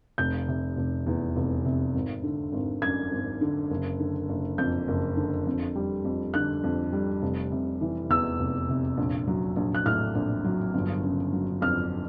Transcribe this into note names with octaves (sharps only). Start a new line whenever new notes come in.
F1 G6
C3
F1
E2
F1
C3
G#1
D3
G#1
F#2 G#6
G#1
D3
F#1
D3
F#1
F2 G6
F#1
D3
F2
G3
F2
D3 F#6
F2
G3
F1
C3
E3
E2 E6
F1
C3
A#1
F#3
A#1
F#6
A2 F6
A#1
F#3
G1
C#3
F#3
F2 F6